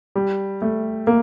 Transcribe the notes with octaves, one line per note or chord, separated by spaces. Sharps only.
G3
A3
A#3